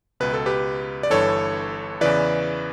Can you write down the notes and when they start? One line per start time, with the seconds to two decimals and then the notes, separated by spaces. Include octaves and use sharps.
0.20 C#2 B2 B4
0.33 A4
0.46 G4 B4
1.03 D5
1.10 G1 G2 E3 A4 C#5
2.01 E2 C#3 E3 B4 D5